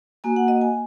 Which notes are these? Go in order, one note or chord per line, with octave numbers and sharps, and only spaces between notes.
A#3 F#4 G#5
F#5
D#5
G#5